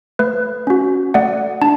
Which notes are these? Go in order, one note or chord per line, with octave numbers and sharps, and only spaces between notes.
A3 B4
C#4 F#4
A3 D5 F#5
D4 A5